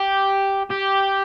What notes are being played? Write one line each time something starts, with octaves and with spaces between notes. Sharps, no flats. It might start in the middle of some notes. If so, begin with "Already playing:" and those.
Already playing: G4
G4